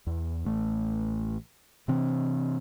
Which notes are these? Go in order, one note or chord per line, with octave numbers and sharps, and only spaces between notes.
E2
A1 A3
C3 E3 C4